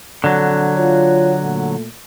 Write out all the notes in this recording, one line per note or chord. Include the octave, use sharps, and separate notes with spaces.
A#1 D3 F#3 C4 A4
F4 C#5
A#2 A3